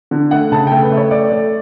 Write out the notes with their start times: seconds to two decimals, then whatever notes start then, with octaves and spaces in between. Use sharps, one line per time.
0.11 D3
0.31 A3 F#5
0.52 C#3 A5
0.67 A3 G5
0.82 B4
0.91 A3
0.97 C#5
1.11 A3 D5
1.31 A3